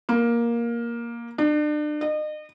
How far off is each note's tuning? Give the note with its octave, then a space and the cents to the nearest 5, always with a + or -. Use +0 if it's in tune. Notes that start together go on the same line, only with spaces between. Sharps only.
A#3 +10
D4 +35
D#5 -35